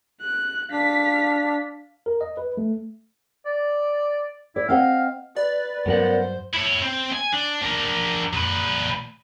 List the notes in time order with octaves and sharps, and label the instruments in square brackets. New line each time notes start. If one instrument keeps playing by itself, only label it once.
[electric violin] F#6
[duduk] D4 [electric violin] F5 B6
[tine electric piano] A#4
D#5
B4
A3
[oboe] D5
[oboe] E4 [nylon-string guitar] D5
[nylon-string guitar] C4 D#5 F#5 [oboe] F5
[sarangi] B4 [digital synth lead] D5
[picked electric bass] G2 F#3 [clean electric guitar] B3 A#4 F#5 [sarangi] C5
[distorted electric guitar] E4 C#5
C4
G#5
D4
D4 A#4
A#2 B4